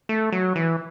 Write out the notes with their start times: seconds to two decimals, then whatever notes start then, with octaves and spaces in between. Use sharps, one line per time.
0.09 A3
0.32 F#3
0.56 E3